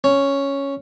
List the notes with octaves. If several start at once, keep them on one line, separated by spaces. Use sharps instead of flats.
C#4